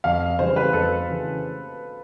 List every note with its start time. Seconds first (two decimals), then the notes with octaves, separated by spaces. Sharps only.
0.04 F2 F5
0.39 C#3 E3 G3 C5
0.56 B4
0.73 F2 A4
1.09 C#3 E3